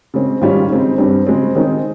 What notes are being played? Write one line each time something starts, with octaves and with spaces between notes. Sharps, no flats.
C#3 G#3 C4
G#2 D#3 G3 C#4 F4
C#3 G#3 C4 D#4
G2 G3 C4
C#3 G#3 C4
D#3 G#3 C4 D#4